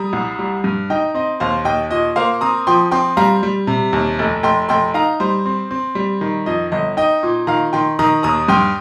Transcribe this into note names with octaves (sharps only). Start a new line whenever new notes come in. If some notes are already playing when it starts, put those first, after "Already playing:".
Already playing: G3 A#5 D#6
C2
G3
G2
D#4 D#5 G5
C4 D#5
D#2 C5 F5
D#2 D#5 G5
A#2 D#5
A#3 C5 F5
C4 A#5 D#6
F3 G5 C6
C4 G5 C6
G3 F5 A#5
G3
C3
D#2
F1
F1 G5 C6
F1 G5 C6
D#4 F5 A#5
G3 C5
C4
C4
G3
D#3
F2 D#5
G1 D#5
D#4 D#5 G5
A#2
D#3 F5 A#5
D#3 G5 C6
D#3 A#5 D#6
D#2 A#5 D#6
G2 G5 C6